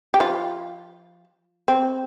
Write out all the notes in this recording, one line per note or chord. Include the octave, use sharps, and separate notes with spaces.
G4
F3 F4
C4